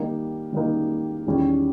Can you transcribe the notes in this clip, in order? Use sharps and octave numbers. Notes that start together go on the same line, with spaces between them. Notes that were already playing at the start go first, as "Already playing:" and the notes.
Already playing: D#3 G3 A#3 D#4
D#3 G3 A#3 D#4
E2 D#3 G3 C#4